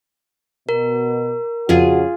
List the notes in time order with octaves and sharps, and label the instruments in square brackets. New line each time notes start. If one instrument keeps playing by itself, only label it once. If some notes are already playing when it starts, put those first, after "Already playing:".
[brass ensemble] B2 [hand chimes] A#4
[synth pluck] F2 [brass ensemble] C#3 F#4 F#5 [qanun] F4 G#4